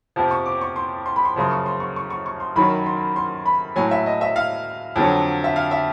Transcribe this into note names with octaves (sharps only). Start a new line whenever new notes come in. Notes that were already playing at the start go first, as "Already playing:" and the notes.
F2 C3 F3
C#6
D6
C#6
C6
C6
B5
C6
F#2 C#3 F3 C6
C#6
C6
C#6
C#6
C#6
C#6
C6
F#2 D#3 F#3 B5
C6
C6
B5
A2 F#3 G#5
E5
D#5
E5
F5
F2 D3 F#3
E5
F5
E5